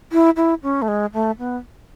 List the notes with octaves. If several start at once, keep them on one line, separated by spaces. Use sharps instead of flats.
E4
E4
C#4
A3
G#3
A3
B3